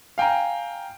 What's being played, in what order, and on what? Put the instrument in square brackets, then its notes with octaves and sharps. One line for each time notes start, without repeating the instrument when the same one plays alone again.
[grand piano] F5 G5 G#5 A#5